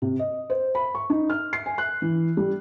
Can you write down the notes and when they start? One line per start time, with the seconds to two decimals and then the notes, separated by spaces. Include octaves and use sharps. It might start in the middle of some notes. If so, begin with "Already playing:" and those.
0.02 C3
0.19 D#5
0.50 C5
0.75 B5
0.95 C#6
1.10 D#4
1.30 F6
1.53 C7
1.66 G#5
1.78 F#6
2.02 E3
2.37 G3